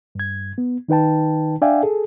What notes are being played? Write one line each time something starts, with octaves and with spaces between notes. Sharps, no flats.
G2 G#6
B3
D#3 D#4 B4 G5 A5
D4 D5 E5 F5 G5 G#5
G#4 A4